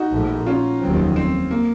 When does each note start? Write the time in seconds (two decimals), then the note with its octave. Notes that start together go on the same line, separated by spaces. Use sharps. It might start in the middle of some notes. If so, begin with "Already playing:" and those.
Already playing: D#4 F#4
0.12 A#1 A2 F3 A3
0.46 C#4 F4
0.81 F1 D#2 D#3 F#3 C4
1.16 C4
1.51 A#3